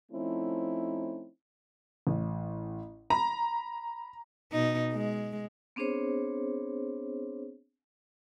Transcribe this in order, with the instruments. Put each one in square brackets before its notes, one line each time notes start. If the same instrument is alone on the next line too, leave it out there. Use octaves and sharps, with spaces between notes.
[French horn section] F3 A3 C4 C#4 D#4 E4
[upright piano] A1
[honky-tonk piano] A#5 [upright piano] B5
[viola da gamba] B2 D#4
G#3
[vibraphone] B3 C4 D4 G#4 C5 C#5